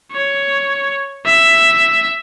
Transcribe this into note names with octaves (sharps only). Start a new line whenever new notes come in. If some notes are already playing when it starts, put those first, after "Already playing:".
C#5
E5